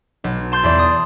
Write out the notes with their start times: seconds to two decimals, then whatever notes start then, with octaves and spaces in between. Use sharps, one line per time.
0.24 B1
0.52 A5 C6 G6
0.63 E2 D5
0.79 D#6